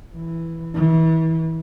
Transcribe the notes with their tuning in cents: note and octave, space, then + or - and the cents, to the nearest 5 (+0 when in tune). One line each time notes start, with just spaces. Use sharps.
E3 +0
E3 -30